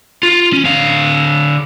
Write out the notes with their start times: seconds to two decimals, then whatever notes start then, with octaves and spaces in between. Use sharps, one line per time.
0.23 F4
0.53 C#4
0.65 D3 F5